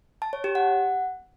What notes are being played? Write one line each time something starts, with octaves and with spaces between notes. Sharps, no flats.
A5
C#5
G4
F#5